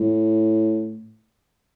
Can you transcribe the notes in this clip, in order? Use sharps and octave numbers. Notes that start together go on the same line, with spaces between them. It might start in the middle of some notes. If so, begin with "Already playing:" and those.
Already playing: A2